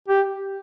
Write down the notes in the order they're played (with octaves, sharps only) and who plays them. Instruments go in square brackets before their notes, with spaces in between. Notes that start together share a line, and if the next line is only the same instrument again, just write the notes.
[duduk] G4